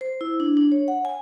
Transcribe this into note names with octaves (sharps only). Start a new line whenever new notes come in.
C5
E4
D4
D4
C#5
F#5
G#5